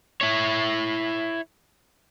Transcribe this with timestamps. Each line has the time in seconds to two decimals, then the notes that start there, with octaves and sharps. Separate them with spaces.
0.21 E4 C#5